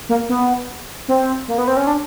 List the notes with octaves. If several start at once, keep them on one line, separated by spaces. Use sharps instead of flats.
A#3
B3
C4
A#3
B3
C4
C#4
D4